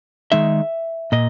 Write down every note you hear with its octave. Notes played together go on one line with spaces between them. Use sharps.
D#3 G#3 D#4 E5
A#2 D#5